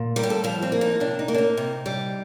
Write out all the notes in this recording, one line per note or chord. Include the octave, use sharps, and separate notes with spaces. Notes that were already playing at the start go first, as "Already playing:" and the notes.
Already playing: A#2
G3 A#4
G4
A4
F3 F4
C4
A#3
D#4
C3 D4
D#4
A#3
D4
D#4
C3
G3